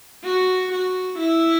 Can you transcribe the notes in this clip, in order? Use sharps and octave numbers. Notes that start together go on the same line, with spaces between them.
F#4
F#4
E4